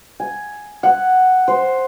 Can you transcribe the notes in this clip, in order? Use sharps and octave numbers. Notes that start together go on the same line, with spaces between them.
G#5
F#5
C5